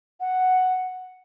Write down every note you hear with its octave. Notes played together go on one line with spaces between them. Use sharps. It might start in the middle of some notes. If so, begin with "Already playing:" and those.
F#5